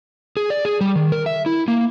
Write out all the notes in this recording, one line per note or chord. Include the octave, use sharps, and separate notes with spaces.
G#4
D5
G#4
G3
D#3
A#4
E5
E4
A#3